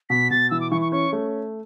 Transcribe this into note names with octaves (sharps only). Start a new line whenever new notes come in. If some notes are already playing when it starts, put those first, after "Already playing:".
B2 B6
B2 A6
E3 E6
D6
E3 C#6
C#6
C#4 C#6
A3